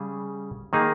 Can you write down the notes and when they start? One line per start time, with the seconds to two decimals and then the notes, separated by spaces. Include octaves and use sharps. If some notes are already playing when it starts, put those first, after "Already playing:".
Already playing: C#3 G3 C#4 G#4
0.73 D#3 A#3 D#4 G#4